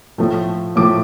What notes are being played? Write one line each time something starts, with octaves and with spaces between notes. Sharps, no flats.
A2 F3 A3
A2 F3 A3 D6